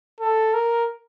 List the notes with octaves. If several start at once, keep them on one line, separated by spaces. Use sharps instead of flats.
A4
A#4